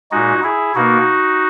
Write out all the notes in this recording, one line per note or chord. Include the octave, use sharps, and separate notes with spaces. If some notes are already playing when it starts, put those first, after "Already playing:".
A#2 G#3 D#4 F#4
E4 G#4
B2 A#3 D#4 F#4